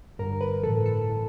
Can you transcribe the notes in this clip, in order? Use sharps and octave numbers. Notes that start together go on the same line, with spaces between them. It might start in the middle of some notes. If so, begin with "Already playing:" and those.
G2 D3 A#4
B4
A2 E3 A4
A4
E3